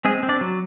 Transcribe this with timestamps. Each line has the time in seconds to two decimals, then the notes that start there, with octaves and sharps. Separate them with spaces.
0.05 G#3 C4 G#4
0.23 C4
0.29 D4 D5
0.41 F#3